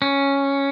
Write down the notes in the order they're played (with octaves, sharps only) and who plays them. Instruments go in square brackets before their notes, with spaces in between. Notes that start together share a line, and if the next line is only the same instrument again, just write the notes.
[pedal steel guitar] C#4